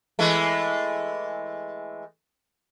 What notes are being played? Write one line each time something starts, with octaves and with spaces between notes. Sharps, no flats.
E3 G#3 A3